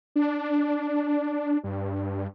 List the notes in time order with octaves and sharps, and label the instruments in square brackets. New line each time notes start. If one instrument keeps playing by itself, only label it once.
[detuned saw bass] D4
G2